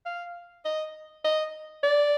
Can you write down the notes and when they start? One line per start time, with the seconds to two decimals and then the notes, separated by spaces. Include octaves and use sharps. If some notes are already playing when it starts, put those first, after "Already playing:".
0.05 F5
0.65 D#5
1.24 D#5
1.83 D5